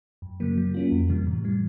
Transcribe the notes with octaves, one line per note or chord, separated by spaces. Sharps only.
F#2
C#3 F#3 A#3
F#3
A#3 C#4 F4
F2
C3 E3 G3
A2
E3 G3